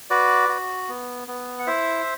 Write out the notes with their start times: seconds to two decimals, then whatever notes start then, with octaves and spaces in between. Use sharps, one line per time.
0.10 F#4 B4 D5
0.49 F#4
0.89 B3
1.28 B3
1.59 F#5
1.67 E4 C5 E5